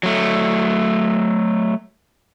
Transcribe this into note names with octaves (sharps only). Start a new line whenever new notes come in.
F#3 A3